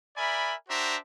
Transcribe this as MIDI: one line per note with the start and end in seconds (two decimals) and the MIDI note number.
0.17 0.54 70
0.17 0.54 74
0.17 0.54 76
0.17 0.54 80
0.17 0.54 83
0.69 0.97 62
0.69 0.97 66
0.69 0.97 72
0.69 0.97 76
0.69 0.97 79
0.69 0.97 82